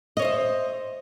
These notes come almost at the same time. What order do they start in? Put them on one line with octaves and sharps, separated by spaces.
D#5 C#5 C5 E5